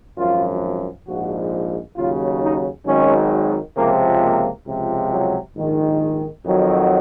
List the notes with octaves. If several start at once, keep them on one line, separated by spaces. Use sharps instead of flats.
G#1 F#2 F3 F4
A#1 G#2 F3 F#4
D#2 C#3 F#3 F4
D#4
G#1 G#2 D#3 F#3 C#4
C#2 C3 F3 A#3
A#3
C#2 C3 F3
F#3
A#1 G#2 D#3
F2 D#3 F#3